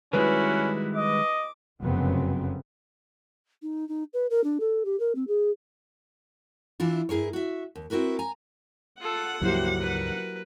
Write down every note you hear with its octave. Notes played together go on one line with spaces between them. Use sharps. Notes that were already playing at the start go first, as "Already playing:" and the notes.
D#3 G3 G#3 C#4 E4 F#4 B4
D#5 D6
F1 F#2 C#3 F#3 B3 C4
D#4
D#4
B4
A#4
D4
A4
G4
A#4
C4
G#4
E3 D4 E4 F4
G2 E4 G#4 A#4 C#5
F#4 E5
D#2
C4 E4 F#4 A#4 B4
G#5 A#5
F4 A4 F#5
C#2 G2 F3 F#3 A#3 E4 G4 C5
A#4 B4